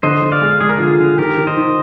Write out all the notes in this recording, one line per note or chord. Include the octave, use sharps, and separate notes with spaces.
D3 C5 D#5
D3
D5 F5
G#3
G#3 G#4
A#4
D3 F4 G#4
D3
D#3 G4 A#4
D#3
C5 D#5
D#3